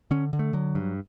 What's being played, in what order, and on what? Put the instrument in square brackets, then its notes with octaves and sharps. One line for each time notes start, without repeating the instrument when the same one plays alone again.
[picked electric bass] D3 C#4
D3
A3
D3 F#3
G2